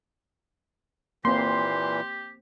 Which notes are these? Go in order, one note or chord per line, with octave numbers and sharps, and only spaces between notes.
A#2 E3 A#3 C4 G4 C6